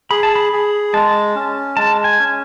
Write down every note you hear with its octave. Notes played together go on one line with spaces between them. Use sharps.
G#4 B5
A5
B5
G#4
G#3 A5
C#4
G#3 A5
G#5
C#4